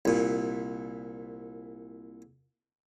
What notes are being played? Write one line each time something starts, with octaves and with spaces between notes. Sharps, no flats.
C2 A#2